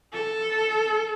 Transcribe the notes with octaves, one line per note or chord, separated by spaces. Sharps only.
A4